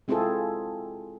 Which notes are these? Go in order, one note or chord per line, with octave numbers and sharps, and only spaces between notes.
G#3 C4 E4 F4 G#4 A4